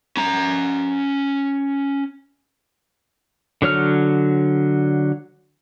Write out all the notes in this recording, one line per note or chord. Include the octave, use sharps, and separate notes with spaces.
C#4 A#5
D3 F#3 C#5 F6